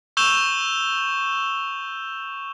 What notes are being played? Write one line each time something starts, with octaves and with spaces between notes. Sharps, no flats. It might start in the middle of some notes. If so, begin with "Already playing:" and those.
C#6 E6 G6 E7 F7 G7